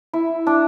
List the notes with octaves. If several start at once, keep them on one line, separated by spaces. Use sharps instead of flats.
E4
D4